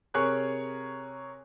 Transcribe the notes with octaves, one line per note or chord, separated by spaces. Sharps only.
C3 G#4 A#4 C#5 C#6 F#6